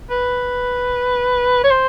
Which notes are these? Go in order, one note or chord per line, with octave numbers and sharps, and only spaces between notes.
B4
C#5
C5